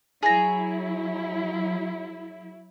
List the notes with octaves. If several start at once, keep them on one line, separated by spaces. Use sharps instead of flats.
F#3 E4 G#4 C#5 A#5